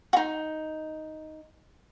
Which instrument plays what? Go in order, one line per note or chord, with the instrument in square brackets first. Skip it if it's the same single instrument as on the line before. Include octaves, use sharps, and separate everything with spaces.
[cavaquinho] D#4 F#4